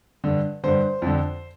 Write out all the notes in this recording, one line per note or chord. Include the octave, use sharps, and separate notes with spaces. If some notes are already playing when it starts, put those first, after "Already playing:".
G2 D3
G2 D3 C5
F2 D3